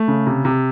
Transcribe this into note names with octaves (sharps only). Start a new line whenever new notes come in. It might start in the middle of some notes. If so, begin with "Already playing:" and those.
Already playing: A3
C#3
C3
C3